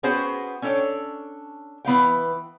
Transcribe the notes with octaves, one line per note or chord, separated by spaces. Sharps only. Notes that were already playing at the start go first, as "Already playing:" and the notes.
B3 C#4 F#4 G#4 C5 G5
C#4 D4 A4 C#5 G5
E3 B3 F5 G5